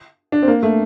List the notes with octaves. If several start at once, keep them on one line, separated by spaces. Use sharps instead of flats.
D4
C4
A#3
A3